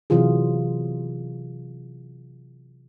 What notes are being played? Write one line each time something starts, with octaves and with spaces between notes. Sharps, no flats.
C3 E3 F#3 F4 G#4